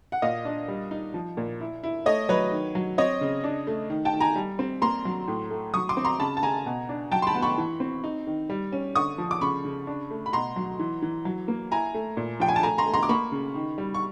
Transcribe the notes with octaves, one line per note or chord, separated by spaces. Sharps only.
F#5
A#2 D#5 F5
D4
G3
D#4
F3
A#2
E4
E4
A3 C#5 D#5
F#3 B4 C#5
D#3
F#3
C4 C#5 D#5
C#3
D4
A3
D#3
G5 A5
D#3
G#5 A#5
G3
C4
A#3 A#5 C6
F#3
A2
A3
F#3 C#6 D#6
C6 D6
C4
A#5 C6
C#3 A5 B5
A5
C#3 G#5 A#5
B2
D4
F#3 G5 A5
C6
A5 B5
B3
B5 C#6
E3
C4
D#4
D#3
G3
C#4
D3 C#6 D#6
F3
D6
C#3 B5 C#6
C#3
D4
A3
B5
B2 A#5 C6
F#3
E3
E3
F#3
A#3
E4 G#5 A#5
A3
A#2
F3 G5
G#5
A5
A3 G#5 A#5
A#5 C6
A3
A#5 C6
D6
A#3 B5 C#6
C#3
D#3
G3
C#6